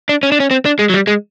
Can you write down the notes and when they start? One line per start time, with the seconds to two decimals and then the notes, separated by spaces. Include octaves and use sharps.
0.09 D4
0.23 C#4
0.32 D4
0.40 C#4
0.51 C4
0.65 D4
0.79 G#3
0.90 F#3
0.94 G3
1.07 G#3